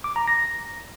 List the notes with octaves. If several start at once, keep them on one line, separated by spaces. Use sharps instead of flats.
D6
A#5
A#6